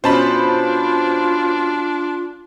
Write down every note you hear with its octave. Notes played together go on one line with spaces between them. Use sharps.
B2 C#4 D4 F4 C5 A5 B5